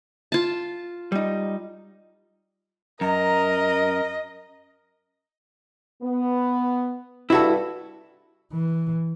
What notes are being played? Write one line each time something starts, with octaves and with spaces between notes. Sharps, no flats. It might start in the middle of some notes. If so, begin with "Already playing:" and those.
F4 A5
G3 D#4
F#2 A#4 D#5 A#5
B3
G2 E4 F#4 A4
E3